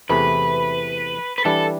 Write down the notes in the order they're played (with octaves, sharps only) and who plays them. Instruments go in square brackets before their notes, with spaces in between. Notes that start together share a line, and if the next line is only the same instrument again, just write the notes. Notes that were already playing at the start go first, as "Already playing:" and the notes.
[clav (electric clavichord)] E2 C3 E3 A3 [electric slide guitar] B4
[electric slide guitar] B4
[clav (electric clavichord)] E3 G3 D4 [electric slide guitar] A4